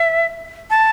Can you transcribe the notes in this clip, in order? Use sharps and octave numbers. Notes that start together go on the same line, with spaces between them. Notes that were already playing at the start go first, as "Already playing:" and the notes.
Already playing: E5
A5